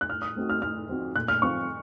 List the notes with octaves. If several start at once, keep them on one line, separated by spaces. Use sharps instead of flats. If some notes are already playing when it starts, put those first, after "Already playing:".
F#6
A2 F6
D#6
A3 C4 D#4 F#4
F6
A2 F6
F3 C4 D#4 F#4
A#2 F#6
F6
F3 C4 F4 C#6